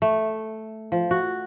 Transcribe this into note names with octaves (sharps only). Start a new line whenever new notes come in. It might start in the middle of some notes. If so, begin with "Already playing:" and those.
A3
F3
F#4